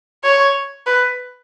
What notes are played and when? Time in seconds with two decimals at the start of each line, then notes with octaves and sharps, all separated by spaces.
0.24 C#5
0.86 B4